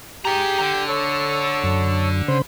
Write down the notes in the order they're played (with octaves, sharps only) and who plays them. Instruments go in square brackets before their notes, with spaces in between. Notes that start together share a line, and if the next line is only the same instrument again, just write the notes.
[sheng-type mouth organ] G4 G6 [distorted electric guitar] G#4 A#5
[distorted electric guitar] D3
[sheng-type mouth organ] A4 C#5
[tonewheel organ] F#2
[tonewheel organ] C#3 C5 [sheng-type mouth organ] B5